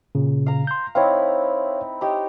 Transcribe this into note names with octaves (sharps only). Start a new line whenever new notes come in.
A#2 C#3
F5 A#5
C6 G6
C4 D#4 E4 C#5 F5
D#4 G4 C#5